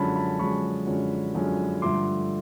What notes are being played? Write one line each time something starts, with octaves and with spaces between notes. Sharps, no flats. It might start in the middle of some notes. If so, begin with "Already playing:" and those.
Already playing: F#2 D3 F3 G#3 C#4 A5 B5
A5 B5
F#2 D3 F3 G#3 C#4 B5 C#6
F#2 D3 F3 G#3 C#4
F#2 D3 F3 G#3 C#4
G2 D3 F3 A3 C6 D6